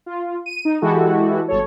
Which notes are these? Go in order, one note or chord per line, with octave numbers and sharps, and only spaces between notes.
F4
D#7
D#4
E3 G#3 E4 F#4 G4 A4
G1 A4 C#5